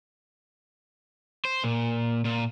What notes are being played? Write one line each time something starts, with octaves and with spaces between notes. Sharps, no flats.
C5
A#2
A#2